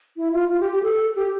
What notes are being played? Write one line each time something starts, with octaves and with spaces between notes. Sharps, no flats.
E4
F4
F4
G4
G4
A4
G4